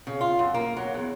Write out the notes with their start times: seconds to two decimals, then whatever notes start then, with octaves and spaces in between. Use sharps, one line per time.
0.07 C#3
0.21 F4
0.39 F#2
0.54 A#3
0.77 F#3
0.94 E2